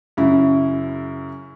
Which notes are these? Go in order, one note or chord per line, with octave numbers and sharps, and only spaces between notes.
F#2 C#3 E4